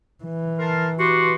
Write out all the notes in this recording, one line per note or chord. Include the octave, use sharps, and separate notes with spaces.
E3
A#4 A5 C6
F#4 G4 B4 C6